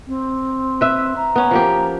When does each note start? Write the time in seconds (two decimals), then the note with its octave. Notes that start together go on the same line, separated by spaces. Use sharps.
0.07 C4
0.81 B4 E5
1.16 A#5
1.36 B3 C#4
1.51 F3 A#3 G4